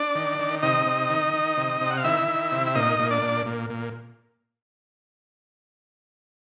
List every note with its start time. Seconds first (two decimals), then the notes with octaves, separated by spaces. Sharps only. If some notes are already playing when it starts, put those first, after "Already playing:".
Already playing: D4 D5
0.15 D#3
0.39 D#3
0.62 C3 D#4 D#5
0.86 C3
1.10 D#3
1.34 D#3
1.57 C3
1.81 C3
1.90 F#5
1.97 F5
2.04 D#3 E4 E5
2.28 D#3
2.52 C3
2.67 E5
2.75 A#2 D#4 D#5
2.99 A#2
3.10 D4 D5
3.22 A#2
3.46 A#2
3.70 A#2